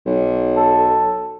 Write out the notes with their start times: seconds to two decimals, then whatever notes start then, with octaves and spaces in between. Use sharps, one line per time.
0.06 B1
0.57 A4